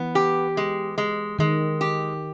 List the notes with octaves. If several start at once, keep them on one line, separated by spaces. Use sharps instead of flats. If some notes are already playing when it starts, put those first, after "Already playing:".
Already playing: E3 B3
G4
G#3
G#3
D#3 G#3
G4